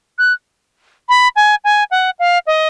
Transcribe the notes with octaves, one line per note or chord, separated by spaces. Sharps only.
F#6
B5
G#5
G#5
F#5
F5
D#5